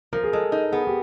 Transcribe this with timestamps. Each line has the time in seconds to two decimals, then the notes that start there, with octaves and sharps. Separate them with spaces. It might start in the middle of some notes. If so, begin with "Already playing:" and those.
0.13 F3 A#4
0.24 G#4
0.32 G#3 A4
0.52 D#4
0.72 B3 G#4
0.87 G4